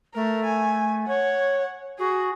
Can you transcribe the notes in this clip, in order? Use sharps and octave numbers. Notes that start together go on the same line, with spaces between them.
A3 A#4
G#5
C#5 F#5
F#4 G#4